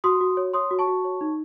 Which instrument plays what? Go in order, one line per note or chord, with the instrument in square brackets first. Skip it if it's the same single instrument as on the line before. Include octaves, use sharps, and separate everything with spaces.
[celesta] F#4 C6 D#6
F#4
C#5
C#5 C6 D#6
F#4
A5 C#6
F#4
C#5
D#4